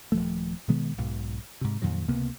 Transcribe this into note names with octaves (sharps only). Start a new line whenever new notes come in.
D#1 F3 A3
B2 D#3 G#3 B3
B1 G#2 B2
G#2 C3
F2 A#2 D#3 F#3
C#2 C3 A#3 B3